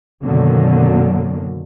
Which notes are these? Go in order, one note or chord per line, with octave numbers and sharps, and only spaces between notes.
F#2 B2 D3 D#3 F#3 A#3